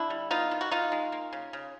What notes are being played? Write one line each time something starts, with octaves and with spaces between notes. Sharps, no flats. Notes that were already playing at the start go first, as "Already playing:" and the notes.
Already playing: D3 D4 E4
G3
B3 D#4 F4
D#3
F#4
D#3 D#4 F4
G#3
A#3
C#3
C#3